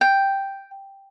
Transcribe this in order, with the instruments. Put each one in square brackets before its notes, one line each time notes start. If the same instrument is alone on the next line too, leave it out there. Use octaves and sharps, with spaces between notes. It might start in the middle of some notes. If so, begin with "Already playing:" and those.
[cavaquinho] G5